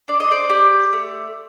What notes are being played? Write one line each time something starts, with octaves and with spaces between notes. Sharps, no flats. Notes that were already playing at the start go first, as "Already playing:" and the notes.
D4 D5
D#5
C5 D5
G4
A3